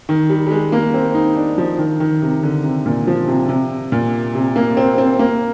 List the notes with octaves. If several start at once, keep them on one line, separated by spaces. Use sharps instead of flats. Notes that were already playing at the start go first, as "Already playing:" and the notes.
D#3
G3
G3
G#3
A#3
C4
D#4
D4
F3
D#3
D#3
C3
D3
C3
A#2
F3
C3
C3
A#2
C3
A#3
C4
C4
A#3